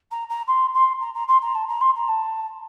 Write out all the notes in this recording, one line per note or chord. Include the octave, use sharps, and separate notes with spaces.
A#5
A#5
C6
C6
A#5
A#5
C6
A#5
A5
A#5
C6
A#5
A5